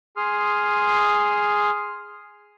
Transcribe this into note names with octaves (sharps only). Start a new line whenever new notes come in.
G#4 C6 D#6 F6